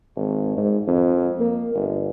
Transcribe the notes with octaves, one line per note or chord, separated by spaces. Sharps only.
G#1
G#2
F2
A#3
G1